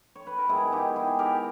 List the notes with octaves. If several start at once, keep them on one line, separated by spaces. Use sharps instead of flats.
C#5
B4
A#4
G#2 D#3 G#3 B3 E4 G#4
D#4 G4
E4 G#4
G4 A#4